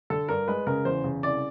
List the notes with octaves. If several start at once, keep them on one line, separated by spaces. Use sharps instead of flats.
D3 A4
G2 A#4
G#3 B4
C#3 A#4
E2 C5
C#3
C2 D5